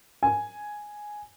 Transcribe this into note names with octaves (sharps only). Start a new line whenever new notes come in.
G#5